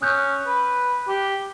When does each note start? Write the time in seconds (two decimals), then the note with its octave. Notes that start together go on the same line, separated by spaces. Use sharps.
0.02 C#4 D#6 F#6 G6
0.47 B4
1.08 G4